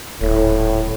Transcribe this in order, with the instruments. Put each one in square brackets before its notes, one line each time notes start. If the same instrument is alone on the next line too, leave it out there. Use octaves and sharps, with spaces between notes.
[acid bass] D#1 [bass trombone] A2